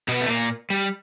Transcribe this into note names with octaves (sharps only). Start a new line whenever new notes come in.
B2 B3
A3
A#2 A#3
G3